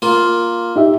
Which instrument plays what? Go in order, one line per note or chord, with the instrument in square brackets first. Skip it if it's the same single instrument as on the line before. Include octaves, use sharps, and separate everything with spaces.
[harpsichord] A#3 F4
[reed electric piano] D#4 G4 E5